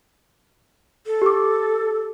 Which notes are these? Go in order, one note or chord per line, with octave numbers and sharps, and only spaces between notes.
A4
G4 D6